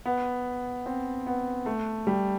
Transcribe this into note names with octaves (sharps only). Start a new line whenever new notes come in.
B3
C4
B3
A3
G3